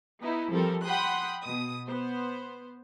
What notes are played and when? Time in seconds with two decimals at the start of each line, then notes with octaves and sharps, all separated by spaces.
0.21 B3 D#4 E4
0.51 F3 G3 C4 A4 A#4
0.84 F#5 G5 B5 C6 D#6 F#6
1.43 B2 D#6
1.87 B3 C5